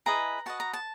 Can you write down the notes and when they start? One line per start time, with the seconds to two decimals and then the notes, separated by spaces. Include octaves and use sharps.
0.06 E4 G#4 B4 D#5 A#5
0.46 F#4 B4 D#5 A5
0.60 A#5
0.73 A5